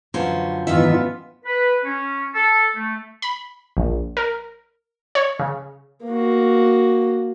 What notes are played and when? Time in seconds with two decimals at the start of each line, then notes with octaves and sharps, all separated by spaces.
0.14 F#2 D3 F3 C#4 B4 C5
0.67 G#2 D#3 E3 B3 D#4 F4 E5
1.44 B4
1.84 C#4
2.34 A4
2.75 A3
3.22 B5
3.77 A#1
4.17 A#4
5.15 C#5
5.39 C#3
6.05 A#3 F#4